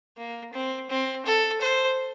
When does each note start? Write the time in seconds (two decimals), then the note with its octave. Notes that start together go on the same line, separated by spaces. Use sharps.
0.18 A#3
0.53 C4
0.90 C4
1.26 A4
1.61 C5